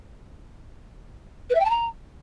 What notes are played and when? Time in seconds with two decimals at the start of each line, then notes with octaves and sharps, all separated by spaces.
1.50 B4
1.55 E5
1.60 G5
1.65 A5
1.70 A#5